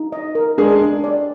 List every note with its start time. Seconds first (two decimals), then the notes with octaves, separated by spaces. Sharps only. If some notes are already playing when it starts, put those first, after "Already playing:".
Already playing: D#4
0.12 D#5
0.35 A#4
0.58 G#3 D4 G#4
0.81 D4
1.04 D5